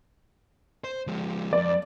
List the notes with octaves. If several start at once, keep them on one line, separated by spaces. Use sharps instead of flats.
C5
F3 G#3
F2 D5